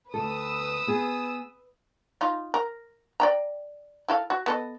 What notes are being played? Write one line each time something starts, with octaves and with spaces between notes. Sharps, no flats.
D2 G2 A4 B4 D#6 E6
B3 G#4
D#4 F4
A#4
D5 G5 A#5
E4 A4 F5
F#4
B3 A4 D#5